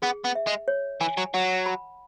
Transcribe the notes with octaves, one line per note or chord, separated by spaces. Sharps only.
B3 G#4
B3
E5
G#3
C#5
E3 G#5
F#3
F#3 F#5
B5